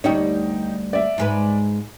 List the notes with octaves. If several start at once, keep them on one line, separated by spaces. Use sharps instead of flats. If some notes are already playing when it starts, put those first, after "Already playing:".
D2 G3 D#4 C#5 G5
D5 E5
G#2 G#3 B4